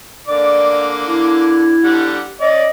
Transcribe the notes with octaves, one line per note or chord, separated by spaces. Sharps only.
D3 A#3 D5 D6
E4
D3 G3 F#5
C#4 D5 D#5